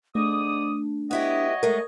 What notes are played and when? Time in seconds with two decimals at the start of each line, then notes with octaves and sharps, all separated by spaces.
0.15 G#2 A3 D4 D5 D#6
1.11 B3 E4 F#4 G4 C#5 D#5
1.63 G#3 A3 A#4